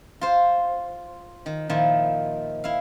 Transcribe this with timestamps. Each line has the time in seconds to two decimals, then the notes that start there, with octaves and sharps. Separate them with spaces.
0.21 F4 C5
1.46 D#3
1.69 A#2 D#3 F3 E4
2.64 E4 F5